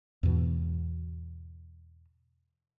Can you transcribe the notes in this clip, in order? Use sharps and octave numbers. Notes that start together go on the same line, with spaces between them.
E2 G#2 B2 E3